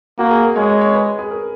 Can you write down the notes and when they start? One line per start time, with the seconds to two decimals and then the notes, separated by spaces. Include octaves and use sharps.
0.19 A#3 F#4
0.31 G#4
0.44 A#4
0.56 G#3 C#5
0.69 C#5
0.81 C#5
0.94 B4
1.06 G#4
1.19 G#4
1.31 A#4